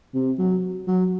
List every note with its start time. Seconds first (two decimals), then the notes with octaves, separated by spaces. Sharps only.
0.14 C3
0.39 F#3
0.87 F#3